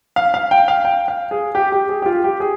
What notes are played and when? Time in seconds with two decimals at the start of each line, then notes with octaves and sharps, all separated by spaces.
0.16 F5
0.34 F5
0.51 G5
0.68 F5
0.85 G5
1.08 F5
1.31 G#4
1.55 G4
1.72 G4
1.89 G#4
2.02 G4
2.06 F4
2.24 G4
2.40 G#4